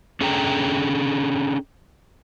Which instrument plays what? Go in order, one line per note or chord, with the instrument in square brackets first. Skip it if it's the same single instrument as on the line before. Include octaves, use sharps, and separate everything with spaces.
[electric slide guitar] C#4 D4 G#4 A4 G5 A#5